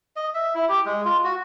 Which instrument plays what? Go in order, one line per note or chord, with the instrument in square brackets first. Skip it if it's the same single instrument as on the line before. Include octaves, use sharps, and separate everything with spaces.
[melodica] D#5
E5
E4
G4
G#3
F4
F#4